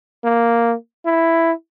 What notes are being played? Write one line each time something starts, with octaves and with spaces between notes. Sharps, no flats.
A#3
E4